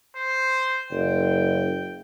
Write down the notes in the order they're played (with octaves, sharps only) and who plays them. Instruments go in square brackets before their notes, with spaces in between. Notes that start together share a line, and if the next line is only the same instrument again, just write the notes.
[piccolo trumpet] C5
[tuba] F#1 [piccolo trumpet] G5